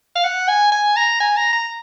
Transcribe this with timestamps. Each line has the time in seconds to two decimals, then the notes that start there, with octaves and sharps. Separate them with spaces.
0.15 F5
0.24 F#5
0.48 G#5
0.72 G#5
0.96 A#5
1.20 G#5
1.37 A#5
1.52 A#5